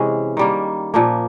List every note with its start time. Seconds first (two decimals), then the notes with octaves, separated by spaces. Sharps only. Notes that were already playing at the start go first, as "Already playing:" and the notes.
Already playing: C3 E3 G#3 C#4
0.37 D#3 G3 A#3
0.94 A#2 F3 A#3